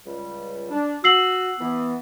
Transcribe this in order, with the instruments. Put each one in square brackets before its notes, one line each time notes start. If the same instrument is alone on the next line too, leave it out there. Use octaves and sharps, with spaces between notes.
[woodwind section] C#2 G3
D4
[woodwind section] F#4 [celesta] E6 C7 F#7
[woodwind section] E3 B3